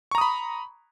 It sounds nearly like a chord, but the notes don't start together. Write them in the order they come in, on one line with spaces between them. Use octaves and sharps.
C#6 A#5 D#6 B5